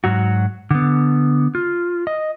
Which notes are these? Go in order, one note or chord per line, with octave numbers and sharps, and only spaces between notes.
G#2 F#3 F#4
D3 B3
F4
D#5